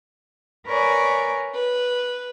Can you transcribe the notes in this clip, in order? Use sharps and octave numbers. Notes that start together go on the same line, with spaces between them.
A#4 B4 C#5 D5 G#5
B4